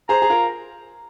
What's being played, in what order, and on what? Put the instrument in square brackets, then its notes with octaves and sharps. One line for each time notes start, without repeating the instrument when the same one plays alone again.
[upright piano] G#4 C5 [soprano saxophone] A#5
[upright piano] G#4
F4 A#4